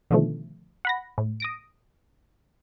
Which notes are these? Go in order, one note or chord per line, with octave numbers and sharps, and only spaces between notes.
B2 D3 D#3 F3 A3
F#5 B5 A#6
A2
D#6 A#6 D7